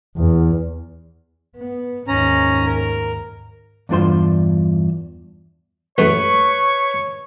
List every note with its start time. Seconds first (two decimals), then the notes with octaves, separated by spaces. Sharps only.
0.17 E2
1.56 B3
2.08 D#2 G#2 C#4 A#5
2.66 A#4
3.89 E2 G2 D4 F4 C5 C6
5.98 A1 F#2 A3 B4 C#5 C#6